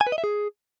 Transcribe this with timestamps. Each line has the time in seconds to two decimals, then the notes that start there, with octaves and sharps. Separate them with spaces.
0.01 G#5
0.07 B4
0.12 D#5
0.18 E5
0.24 G#4